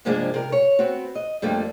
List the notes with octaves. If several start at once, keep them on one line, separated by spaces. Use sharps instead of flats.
G2 C3 F3 G#3 A#3 D4
C3 A#4
C#5
B3 C4 F#4
D#5
F2 G3 A3 A#3 D4